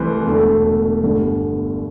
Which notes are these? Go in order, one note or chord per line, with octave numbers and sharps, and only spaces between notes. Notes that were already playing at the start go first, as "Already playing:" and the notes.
Already playing: C2 C3 E3 A3 B4 C5
E1 E2 D3 A3
G1 G2 D3 G3